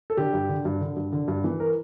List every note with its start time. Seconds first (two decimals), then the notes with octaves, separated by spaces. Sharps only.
0.10 A4
0.17 D3 G4
0.33 G2
0.49 D3
0.65 G2
0.81 D3
0.96 G2
1.13 D3
1.28 G2
1.44 E3
1.60 A#4